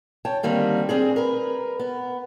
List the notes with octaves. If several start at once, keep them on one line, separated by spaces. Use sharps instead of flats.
C#5 G5 A5
D3 D#3 G3 A#3 C4
C4 D4 G#4
A#4 B4
B3